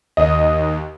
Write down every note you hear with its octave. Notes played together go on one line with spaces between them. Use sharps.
D#2 D#5